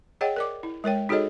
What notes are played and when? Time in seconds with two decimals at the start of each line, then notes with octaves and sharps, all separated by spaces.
0.21 G#4 C#5 D#5 F#5 G5
0.36 A#4 D5 D6
0.63 E4
0.84 G#3 A#4 C#5 G5
1.09 D#4 F#4 G#4 A4 C#5 D#5